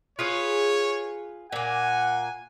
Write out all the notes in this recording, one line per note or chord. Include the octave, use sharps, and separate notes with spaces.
F4 G#4 B4 C#5
A#2 A#3 F#5 G#5